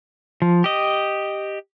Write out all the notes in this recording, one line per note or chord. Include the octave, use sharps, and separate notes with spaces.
F3
G4 D#5